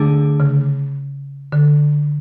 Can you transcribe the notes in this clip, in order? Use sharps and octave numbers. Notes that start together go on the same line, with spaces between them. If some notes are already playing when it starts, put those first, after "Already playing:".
Already playing: D3 A3 D4 G#4
C#3
D3